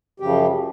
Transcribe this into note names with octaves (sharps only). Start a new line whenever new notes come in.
F#2 C#3 F3 G4